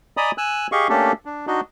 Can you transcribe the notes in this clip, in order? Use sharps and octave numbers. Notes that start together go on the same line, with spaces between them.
D5 D#5 G#5 A#5 B5 D#6
G#5 E6 F#6
G4 G#4 D#5 F5 C#6
A3 A#3 C#4 D4 G4 A4
D4
D4 D#4 F#4 D#5